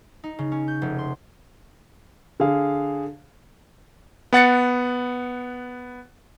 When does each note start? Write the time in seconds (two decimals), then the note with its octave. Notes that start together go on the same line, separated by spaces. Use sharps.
0.24 D#4
0.39 C#3
0.52 C#4
0.68 G6
0.82 F1
0.98 C6
2.40 D3 G#4 F5
4.33 B3 F#5 A6 C#7